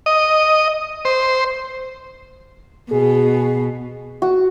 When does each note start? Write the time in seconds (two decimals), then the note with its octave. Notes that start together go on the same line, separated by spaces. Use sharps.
0.06 D#5
1.05 C5
2.92 B2 G#4
4.22 F#4